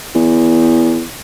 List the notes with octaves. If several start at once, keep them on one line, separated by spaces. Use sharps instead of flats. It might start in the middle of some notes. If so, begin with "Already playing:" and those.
E2